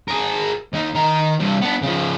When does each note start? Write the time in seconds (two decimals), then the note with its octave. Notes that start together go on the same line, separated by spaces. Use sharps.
0.08 G#4 A#4
0.73 D#2 D#4
0.95 D#3 A#5
1.40 G2 C3
1.62 B3 D4
1.82 C#3 F3